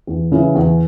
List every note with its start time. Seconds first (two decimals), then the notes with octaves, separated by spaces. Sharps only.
0.07 E2
0.32 C#3 E3
0.55 E2